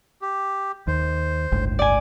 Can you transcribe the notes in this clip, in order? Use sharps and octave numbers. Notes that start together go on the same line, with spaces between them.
G4
D#2 C5
G1 C#2 A2
D5 G#5